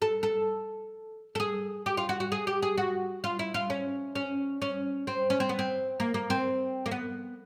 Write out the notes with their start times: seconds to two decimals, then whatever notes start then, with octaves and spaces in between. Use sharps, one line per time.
0.02 A4
0.23 A4
1.35 A4
1.40 G#4
1.86 G4
1.97 F4
2.09 F#4
2.20 F#4
2.32 G#4
2.47 G4
2.62 G#4
2.78 F#4
3.24 F4
3.39 E4
3.54 F4
3.70 C#4
4.15 C#4
4.62 C#4
5.07 C4
5.30 C#4
5.40 C4
5.49 B3
5.59 C4
6.00 A#3
6.14 A#3
6.30 C4
6.86 A#3
6.91 B3